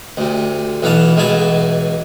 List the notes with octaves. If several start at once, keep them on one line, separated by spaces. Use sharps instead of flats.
D2 C3
B1 E3 B3 F5 F#5 A5
C#2 B2 E3 F#3 G#4 A5